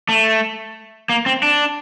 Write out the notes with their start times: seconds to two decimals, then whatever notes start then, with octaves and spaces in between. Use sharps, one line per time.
0.09 A3
1.09 A#3
1.26 C4
1.43 D4